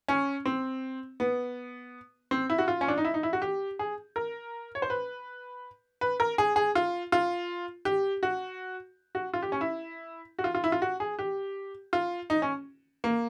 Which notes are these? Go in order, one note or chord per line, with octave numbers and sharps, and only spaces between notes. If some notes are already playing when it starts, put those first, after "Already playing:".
C#4
C4
B3
C4
E4
F#4
F4
C#4
D4
D#4
E4
D#4
E4
F#4
G4
G#4
A#4
C#5
C5
B4
B4
A#4
G#4
G#4
F4
F4
G4
F#4
F#4
F4
G4
C#4
E4
F#4
F4
F4
E4
F4
F#4
G#4
G4
F4
D#4
C#4
A#3